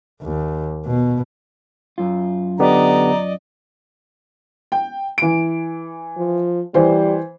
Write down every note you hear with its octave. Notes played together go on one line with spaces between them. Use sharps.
D#2
B2
F#2 F4
D3 B3 G4 D5 D#5 A#5
G5
E3 D7
F3
E3 G3 C5